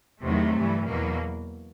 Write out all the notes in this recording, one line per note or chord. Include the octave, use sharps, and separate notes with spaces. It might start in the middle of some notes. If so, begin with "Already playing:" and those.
E2 C3 D#3 F#3 A3
G2 E3
E2 B2 F#3 A#3